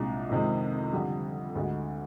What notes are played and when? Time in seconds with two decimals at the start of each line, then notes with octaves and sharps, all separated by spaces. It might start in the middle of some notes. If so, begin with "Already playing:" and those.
Already playing: C2 A#2 G#3 D4
0.29 F2 C3 D#3 G#3
0.93 F2 D3 G3
1.55 D2 D3 G#3